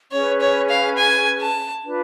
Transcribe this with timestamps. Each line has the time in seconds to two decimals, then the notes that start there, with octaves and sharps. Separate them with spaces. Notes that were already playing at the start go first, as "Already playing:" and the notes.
0.11 C#4 G#4 B4 C#5
0.41 C#5
0.69 F5
0.97 G#5
1.40 A5
1.83 D4 F4 B4